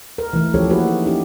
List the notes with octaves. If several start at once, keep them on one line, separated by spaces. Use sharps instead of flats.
A#4 B4
E3 A3 E4
F3 C#4 E4 G4 A4 C#5
A#3 E4 F#4 G#4 B4
A#3 D#4
C#4 D#4 E4 G4